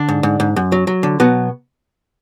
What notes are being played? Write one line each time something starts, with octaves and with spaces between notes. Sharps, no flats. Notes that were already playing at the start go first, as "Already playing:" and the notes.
Already playing: D3 D4
G#2
G#2
G#2
F#2
F#3
F#3
D3
B2 F#3 B3